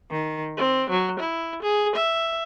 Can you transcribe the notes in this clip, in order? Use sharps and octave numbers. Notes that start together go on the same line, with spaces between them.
D#3
C4
F#3
E4
G#4
E5